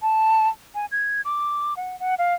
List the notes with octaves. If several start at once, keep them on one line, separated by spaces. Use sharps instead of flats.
A5
G#5
G#6
D6
F#5
F#5
F5